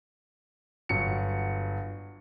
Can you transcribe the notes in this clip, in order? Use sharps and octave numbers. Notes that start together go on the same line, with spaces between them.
G1 F#3 C#7